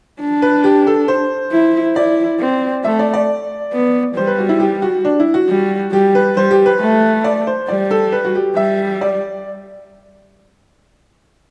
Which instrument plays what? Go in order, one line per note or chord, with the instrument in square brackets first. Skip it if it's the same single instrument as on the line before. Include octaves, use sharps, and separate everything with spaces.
[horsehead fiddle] D4
[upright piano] B4
G4
A4
C5
[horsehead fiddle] E4
[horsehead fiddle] E4 [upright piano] D5
[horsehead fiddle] C4
[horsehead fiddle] A3 [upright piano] E5
[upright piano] D5
D5
[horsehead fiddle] B3
[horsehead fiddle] G3 [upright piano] C5
[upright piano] B4
F#4
E4
G4
F#4
D4
E4
F#4
[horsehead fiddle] G3
[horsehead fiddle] G3 [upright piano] G4
[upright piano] B4
[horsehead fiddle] G3 [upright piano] C5
[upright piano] G4
B4
[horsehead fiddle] A3
[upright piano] D5
C5
[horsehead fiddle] G3 [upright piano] D5
[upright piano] A4
B4
F#4
G4
[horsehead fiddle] G3 [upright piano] E5
[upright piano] D5